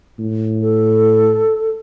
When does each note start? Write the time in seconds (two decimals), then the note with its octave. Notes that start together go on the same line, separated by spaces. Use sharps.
0.19 A2
0.61 A4